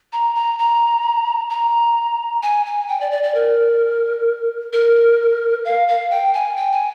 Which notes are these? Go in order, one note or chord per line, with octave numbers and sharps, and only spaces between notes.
A#5
A#5
A#5
A#5
G#5
G#5
G5
D5
D5
D5
A#4
A#4
F5
F5
G5
G#5
G5
G#5